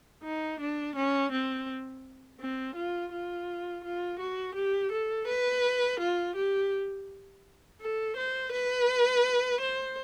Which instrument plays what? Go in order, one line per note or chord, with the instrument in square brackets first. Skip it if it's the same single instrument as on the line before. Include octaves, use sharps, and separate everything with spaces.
[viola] D#4
D4
C#4
C4
C4
F4
F4
F4
F#4
G4
A4
B4
F4
G4
A4
C5
B4
C5